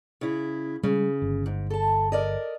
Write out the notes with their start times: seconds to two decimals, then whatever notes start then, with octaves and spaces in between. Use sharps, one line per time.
0.21 C#3 E4
0.83 C#3 G3 G#3
1.22 G1
1.46 G#2
1.70 A4 A5
2.12 A#4 D5 D#5